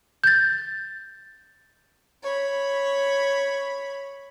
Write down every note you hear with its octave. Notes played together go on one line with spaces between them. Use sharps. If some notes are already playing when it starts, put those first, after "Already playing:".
G6 A6
C#5 B5